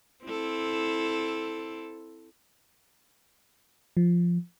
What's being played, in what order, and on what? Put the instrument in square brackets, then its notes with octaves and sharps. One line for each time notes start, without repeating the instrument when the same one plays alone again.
[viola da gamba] C4 E4 A4
[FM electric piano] F3